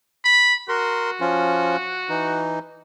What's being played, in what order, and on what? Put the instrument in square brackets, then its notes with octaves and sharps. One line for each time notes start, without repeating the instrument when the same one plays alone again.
[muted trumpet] B5
[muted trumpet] F#4 [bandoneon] A#4 C6
[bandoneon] F3 C#4 F4
E3 D#4